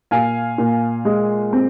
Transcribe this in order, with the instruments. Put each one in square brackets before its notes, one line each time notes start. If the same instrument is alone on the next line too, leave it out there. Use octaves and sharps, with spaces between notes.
[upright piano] A#2 F5 G#5
A#2
G#3
C4